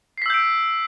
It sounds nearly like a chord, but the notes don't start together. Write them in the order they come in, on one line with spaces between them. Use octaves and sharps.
C7 B6 E6 G6 D7